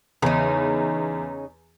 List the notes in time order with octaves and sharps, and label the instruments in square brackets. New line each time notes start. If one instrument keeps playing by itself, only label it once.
[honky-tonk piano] E2 [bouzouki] C#3 D#4